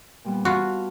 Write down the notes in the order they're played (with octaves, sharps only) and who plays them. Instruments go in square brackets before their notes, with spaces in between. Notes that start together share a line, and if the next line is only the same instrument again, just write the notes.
[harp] A#2 G3 B3
[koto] F4 F#4 [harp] F5 A5 B5